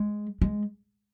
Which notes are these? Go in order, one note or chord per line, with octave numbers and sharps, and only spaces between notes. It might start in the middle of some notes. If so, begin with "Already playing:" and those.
Already playing: G#3
G#3